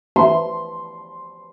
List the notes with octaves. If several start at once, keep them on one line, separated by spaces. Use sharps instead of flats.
C6